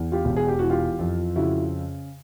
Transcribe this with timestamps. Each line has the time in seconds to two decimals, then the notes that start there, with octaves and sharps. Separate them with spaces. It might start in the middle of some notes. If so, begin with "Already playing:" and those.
Already playing: E2
0.12 F4 G4
0.25 E1
0.36 G#4
0.48 G4
0.59 E3 F#4
0.70 F4 G4
0.99 F2
1.36 C#3 E4 F#4